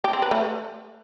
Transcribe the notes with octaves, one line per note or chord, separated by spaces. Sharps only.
G4
C4
B4
A3